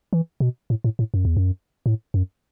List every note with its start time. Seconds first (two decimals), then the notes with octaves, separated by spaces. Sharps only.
0.13 E3
0.40 B2
0.70 A2
0.84 A2
0.99 A2
1.14 F#2
1.25 E2
1.37 F#2
1.86 A2
2.14 F#2